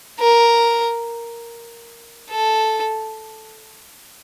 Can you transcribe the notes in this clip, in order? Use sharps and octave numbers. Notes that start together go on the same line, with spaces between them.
A#4
A4